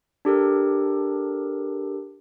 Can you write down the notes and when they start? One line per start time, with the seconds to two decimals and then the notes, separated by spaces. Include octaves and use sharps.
0.25 D4 G4 A4 A#4